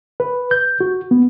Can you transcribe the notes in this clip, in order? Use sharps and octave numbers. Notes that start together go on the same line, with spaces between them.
B4
G6
F#4
B3